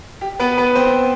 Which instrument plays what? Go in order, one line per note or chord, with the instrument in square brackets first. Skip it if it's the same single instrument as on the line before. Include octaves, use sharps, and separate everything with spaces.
[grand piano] G4
B3 B4
B3 B4
C4 C5